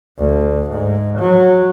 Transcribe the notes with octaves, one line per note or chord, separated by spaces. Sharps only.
D2
G#2
F#3